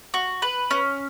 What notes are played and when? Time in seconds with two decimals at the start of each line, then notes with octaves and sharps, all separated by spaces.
0.14 F#4
0.42 B4
0.71 C#4